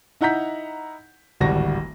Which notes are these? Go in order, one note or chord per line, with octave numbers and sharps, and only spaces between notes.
D#4 E4 F#5 A#5 G6 B6
D1 G#1 G3 F#4 A#6